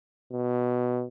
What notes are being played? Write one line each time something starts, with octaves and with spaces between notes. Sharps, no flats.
B2